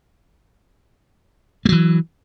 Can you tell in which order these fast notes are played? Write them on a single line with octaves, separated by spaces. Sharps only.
A3 F#3 E3